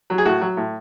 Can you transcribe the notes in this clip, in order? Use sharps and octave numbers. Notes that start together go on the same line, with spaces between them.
F#3
G#4
A2 F#4
F#3
A2